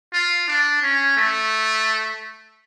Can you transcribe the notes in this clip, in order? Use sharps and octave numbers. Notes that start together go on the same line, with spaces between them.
F4
D4
C#4
A3